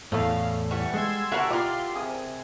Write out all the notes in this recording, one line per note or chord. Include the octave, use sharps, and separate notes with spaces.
E2 A2 A3 F5 B5
E3 G3 F#5 C#6
G#3 C6 E6 G#6
G3 E4 F#4 A#4 E5 F#5 A5
F4 A#4 D5 C6
C3 G#4 D#6